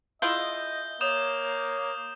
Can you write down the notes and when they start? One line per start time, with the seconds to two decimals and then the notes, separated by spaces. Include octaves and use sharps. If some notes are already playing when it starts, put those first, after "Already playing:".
0.22 E4 F4 G#4 D#5 G6 G7
1.01 A#3 C#5 D#6 G6 E7